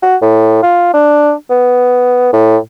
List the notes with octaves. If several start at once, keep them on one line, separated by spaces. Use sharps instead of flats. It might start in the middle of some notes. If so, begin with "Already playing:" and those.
F#4
A2
F4
D4
B3
A2